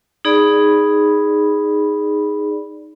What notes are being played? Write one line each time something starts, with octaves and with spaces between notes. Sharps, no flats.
D#4 G#4 D5 B5